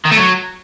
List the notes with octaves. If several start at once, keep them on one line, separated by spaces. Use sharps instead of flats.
D#3
A3
F#3